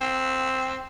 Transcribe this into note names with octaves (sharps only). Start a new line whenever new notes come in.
C4